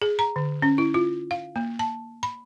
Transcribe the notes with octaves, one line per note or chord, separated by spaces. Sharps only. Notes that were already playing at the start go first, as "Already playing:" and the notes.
G#4
A#5
D3
C#4
E4
F4
F5
A#3
A5
B5